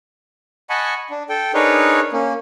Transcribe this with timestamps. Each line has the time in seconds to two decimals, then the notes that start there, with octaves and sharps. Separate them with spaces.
0.70 D#5 F#5 G#5 A5 B5 C#6
1.10 D4
1.29 A4 G5
1.54 D4 D#4 G#4 A#4 B4 C#5
2.13 A#3 C#4